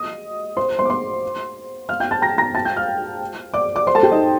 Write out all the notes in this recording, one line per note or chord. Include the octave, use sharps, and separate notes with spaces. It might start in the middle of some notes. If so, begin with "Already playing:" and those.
Already playing: D#5 D#6
C5 C6
C5 C6
D6
C5 C6
F5 F6
G5 G6
A5 A6
A#5 A#6
A#5 A#6
A5 A6
G5 G6
F5 F6
D5 D6
D5 D6
C5 C6
A4 A5
G4 G5
D#4 D#5